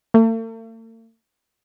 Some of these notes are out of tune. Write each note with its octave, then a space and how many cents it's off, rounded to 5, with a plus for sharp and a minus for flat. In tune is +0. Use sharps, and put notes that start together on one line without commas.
A3 +45